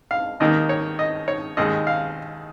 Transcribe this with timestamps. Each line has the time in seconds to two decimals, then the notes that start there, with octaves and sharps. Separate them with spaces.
0.11 F5
0.40 D#2 D#3 A#3 D#5
0.69 C#5
0.99 D#5
1.28 C#5
1.57 D#2 D#3 G#3 D#5
1.87 F5